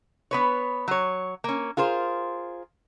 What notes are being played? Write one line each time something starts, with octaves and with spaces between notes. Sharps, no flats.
B3 B4 C#5
F#3 C#5
A#3 C#4
F4 G#4 A#4 C5